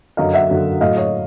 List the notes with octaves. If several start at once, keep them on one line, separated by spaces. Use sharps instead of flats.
F#2 D3 F#3 D#5 F5
E5 F#5
F#2 D3 F#3
A2 F#3 D#5 F5
C#5 D#5